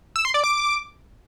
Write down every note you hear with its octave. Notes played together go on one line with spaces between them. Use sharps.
E6
C6
D5
D6